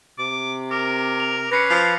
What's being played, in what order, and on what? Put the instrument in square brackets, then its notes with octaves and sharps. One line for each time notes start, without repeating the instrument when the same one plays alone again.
[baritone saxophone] C3 [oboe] D6
[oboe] A#4 [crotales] D6
[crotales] F7
[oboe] C#4 [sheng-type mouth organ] B4 [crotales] A#6 C7 C#7
[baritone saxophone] F3